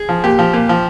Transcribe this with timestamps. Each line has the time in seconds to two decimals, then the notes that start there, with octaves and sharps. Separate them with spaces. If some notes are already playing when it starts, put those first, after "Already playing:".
Already playing: G#4
0.09 F3
0.24 A#2 G4
0.39 F3
0.53 A#2
0.69 F3